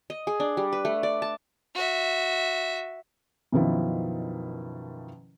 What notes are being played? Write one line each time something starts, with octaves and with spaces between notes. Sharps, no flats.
D#5
G#4
D4
G3
B4
A3
D5
A5
F#4 E5
F#1 B2 D#3 F3 E4